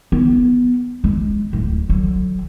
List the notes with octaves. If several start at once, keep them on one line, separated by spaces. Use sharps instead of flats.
B3
G#3
D1
D3 F#3